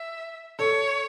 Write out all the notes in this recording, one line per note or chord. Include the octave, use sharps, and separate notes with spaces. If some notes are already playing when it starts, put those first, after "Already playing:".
Already playing: E5
A4 C#5